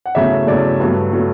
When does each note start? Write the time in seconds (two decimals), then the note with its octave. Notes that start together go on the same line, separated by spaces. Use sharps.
0.06 F#5
0.15 E2 C#3 F#3 A3 E5
0.47 E2 C#3 F#3 A3 D5
0.80 G2 F#3 A3
1.13 F#3 A3